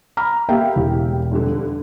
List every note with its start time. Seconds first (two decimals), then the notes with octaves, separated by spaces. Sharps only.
0.17 A#5 B5 F6
0.49 A#3 G4 E5 F5 G5
0.76 E1 E4 G4
1.31 F1 G2 D3